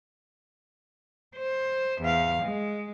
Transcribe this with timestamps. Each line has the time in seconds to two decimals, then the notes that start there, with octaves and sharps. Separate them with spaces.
1.36 C5
2.01 E2 F5
2.42 G#3